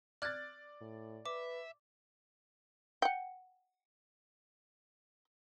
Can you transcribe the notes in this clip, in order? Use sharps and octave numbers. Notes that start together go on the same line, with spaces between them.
D5 F6 F#6 G#6 A6
A2
B4 E5 D6
F#5 G5